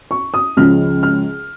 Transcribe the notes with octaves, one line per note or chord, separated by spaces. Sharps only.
C#6
D#6
C#2 C#3 F3 F6
F6